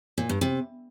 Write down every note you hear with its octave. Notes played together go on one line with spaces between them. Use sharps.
A#2
G2
C3